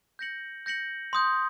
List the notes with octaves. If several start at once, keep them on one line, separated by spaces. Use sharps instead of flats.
G6 A#6 C#7 F#7
G6 A#6 C#7 F#7
C6 D#6 G6